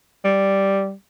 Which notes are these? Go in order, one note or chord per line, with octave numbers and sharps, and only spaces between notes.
G3